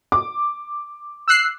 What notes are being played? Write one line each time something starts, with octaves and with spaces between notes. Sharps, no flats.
D6
E6 F#6 C7